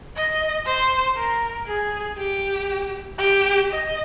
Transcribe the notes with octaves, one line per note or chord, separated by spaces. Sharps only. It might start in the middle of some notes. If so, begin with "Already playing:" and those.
D#5
C5
A#4
G#4
G4
G4
D#5